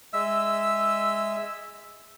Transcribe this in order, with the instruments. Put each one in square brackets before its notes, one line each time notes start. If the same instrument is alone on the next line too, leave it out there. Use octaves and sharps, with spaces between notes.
[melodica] G#3 E5 E6